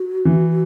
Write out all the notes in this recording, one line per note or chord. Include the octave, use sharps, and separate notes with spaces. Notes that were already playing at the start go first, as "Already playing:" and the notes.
Already playing: F#4
E3